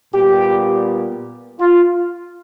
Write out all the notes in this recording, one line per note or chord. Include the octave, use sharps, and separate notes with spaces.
A#2 G3 B3 G4
F4